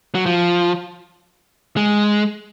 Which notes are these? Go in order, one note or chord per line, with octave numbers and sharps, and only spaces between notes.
F#3
F3
G#3